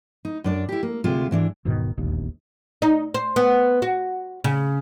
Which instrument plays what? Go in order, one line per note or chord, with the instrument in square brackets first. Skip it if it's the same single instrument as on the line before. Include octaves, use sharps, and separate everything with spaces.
[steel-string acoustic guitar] D#4
F#2 D4 D5
E4 G4
A#3
D2 C3 G#3 F4
G#2 E3 D4
[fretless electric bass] E1 G#2 B2 D#3
E1 A#1 D#2
[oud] D#4
C5
B3
F#4
C#3